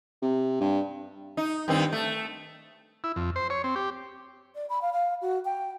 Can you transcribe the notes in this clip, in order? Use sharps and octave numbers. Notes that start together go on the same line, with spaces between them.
C3
G2
D#4
G2 D#3 C4
A3
E4
F2
C5
C#5
C4
G4
D5
B5
F5
F5
F#4
G5